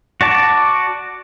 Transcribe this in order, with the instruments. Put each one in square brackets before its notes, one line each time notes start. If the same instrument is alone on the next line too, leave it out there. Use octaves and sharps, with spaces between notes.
[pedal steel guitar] F#4 D5 A5 D6